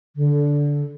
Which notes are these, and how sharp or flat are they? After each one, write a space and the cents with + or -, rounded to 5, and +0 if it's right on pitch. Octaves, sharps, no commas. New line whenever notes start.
D3 -15